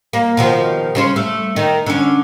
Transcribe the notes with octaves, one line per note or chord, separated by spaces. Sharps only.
A#3
B2 D#3 F3
C#3 C#4 C5
A3
D#3
D3 C#4